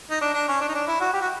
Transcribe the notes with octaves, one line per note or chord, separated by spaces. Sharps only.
D#4
D4
D4
C#4
D4
D#4
D4
E4
F#4
G4
F#4